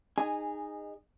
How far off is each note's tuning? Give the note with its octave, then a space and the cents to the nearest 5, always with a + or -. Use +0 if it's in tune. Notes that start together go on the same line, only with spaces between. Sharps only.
D#4 -15 G#4 -15 G#5 +0